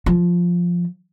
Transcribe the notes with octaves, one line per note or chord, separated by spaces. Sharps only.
F3